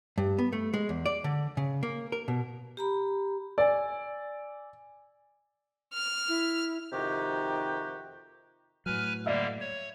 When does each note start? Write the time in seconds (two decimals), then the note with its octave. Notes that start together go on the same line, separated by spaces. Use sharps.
0.18 G2
0.38 B3
0.53 A3
0.74 G#3
0.89 E2
1.06 D5
1.24 D3
1.57 C#3
1.83 A#3
2.12 A#4
2.28 B2
2.77 G4 A#5 B5
3.58 D5 G#5 E6
5.94 F6
6.29 E4
6.93 F2 C3 D#3 D#4 F#4 G4
8.86 A2 F#3 B4 G#5 F6
9.26 D3 G3 A#3 D5 E5
9.61 C#5